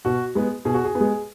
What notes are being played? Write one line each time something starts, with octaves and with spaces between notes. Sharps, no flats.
B2 F#4
G#3 B3
B2 G#4
F#4
G#4
B3
G#3